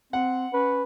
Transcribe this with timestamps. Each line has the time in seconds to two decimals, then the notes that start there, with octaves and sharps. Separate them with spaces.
0.13 C4 F#5
0.53 C#4 B4